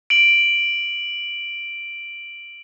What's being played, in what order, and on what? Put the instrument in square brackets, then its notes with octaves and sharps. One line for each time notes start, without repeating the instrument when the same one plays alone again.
[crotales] D7 F#7